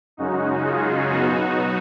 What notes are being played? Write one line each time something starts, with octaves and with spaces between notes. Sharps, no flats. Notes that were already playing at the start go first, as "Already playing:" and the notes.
F#2 C#3 G#3 C#4 D#4 F#4
F4 G#4
B2 F#3 B3 D#4 F#4